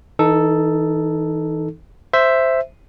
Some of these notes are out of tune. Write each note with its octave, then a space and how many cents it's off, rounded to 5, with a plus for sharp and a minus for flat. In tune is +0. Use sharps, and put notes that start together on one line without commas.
E3 -30 D#4 +0 A4 +0
C5 +0 E5 +5